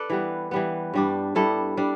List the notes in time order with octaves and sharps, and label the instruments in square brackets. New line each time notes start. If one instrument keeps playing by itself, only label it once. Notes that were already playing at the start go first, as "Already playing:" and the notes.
Already playing: [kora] A4 B4 D5
E3 G3 B3
E3 G3 B3
G2 G3 D4
G2 G3 D4 E4 A4
G3 D4